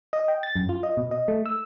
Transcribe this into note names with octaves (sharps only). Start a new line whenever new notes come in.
D#5
G5
A6
F#2
F4
D#5
B2
D#5
A3
E6